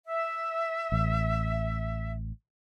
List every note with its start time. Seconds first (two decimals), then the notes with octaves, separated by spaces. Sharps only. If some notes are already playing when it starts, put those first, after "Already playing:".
0.06 E5
0.92 A1